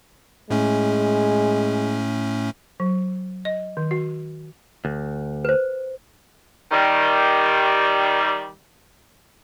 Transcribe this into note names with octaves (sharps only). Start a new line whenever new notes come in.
A2 G#3 A3 C#4
F#3
D#5
D#3
F#4
D2
B4 C5
D#3 G3